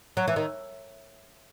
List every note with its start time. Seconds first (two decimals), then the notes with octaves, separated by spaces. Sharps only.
0.17 F#3
0.28 E3
0.36 D#3